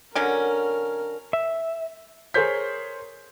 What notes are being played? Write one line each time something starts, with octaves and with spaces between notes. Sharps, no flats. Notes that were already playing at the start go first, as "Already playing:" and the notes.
D3 F#3 C#4 A#4
E5
G#4 A#4 C5 C#5 G6 B6